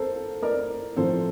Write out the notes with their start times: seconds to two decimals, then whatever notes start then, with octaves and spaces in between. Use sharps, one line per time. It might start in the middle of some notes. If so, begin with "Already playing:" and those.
Already playing: A4 A#4 C5
0.42 A#4 D5
0.96 A2 F3 C4 A4 C5